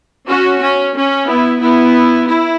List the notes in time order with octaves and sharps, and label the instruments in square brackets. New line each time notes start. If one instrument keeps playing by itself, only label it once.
[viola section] C#4 F#4
C#4
C#4
B3 E4
B3 E4
E4